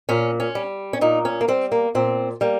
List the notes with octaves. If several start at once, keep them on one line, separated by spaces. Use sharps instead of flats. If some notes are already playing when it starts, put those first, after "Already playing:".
A#2 C#4
C#4
G3
C#4
A#2 D#4
C#4
A#3
G3 C4
A#3
A#2 C4
G3 A#3